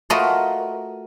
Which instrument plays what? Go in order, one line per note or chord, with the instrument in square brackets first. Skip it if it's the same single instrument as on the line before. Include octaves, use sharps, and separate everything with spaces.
[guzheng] A3 F4 F#4 A#4 B4 D#5